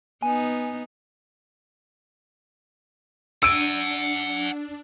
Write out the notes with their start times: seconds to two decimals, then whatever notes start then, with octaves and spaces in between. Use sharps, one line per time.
0.23 B3 D#4 G#5
3.43 D4 F#5 G#5 E6 D7